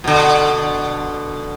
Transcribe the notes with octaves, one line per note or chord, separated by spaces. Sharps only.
B2 D3